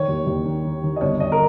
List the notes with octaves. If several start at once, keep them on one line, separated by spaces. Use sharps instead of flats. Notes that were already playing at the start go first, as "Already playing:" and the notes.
Already playing: D#3 C#5
D#2
D#2
D#3
D#3
D#3
D#5
G1 C#5
G1 D#5
A#4